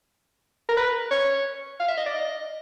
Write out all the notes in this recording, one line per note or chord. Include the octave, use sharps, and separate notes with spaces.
A#4
B4
C#5
F5
E5
D#5
D5
D#5